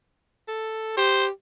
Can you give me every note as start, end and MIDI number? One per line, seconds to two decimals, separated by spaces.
0.48 0.95 69
0.97 1.30 67
0.97 1.25 72